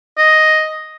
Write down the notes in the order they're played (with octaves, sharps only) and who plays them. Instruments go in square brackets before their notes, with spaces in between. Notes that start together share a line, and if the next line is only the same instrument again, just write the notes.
[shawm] D#5